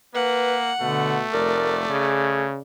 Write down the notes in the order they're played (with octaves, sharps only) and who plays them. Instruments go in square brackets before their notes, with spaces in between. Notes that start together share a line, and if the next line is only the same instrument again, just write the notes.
[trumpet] A#3 [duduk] B4 [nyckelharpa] F#5
[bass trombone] B2 [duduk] D3 [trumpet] A3
[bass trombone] F1 [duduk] A#4 [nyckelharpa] D5
[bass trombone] C#3 [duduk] G#4